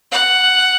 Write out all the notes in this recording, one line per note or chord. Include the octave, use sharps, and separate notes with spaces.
F#5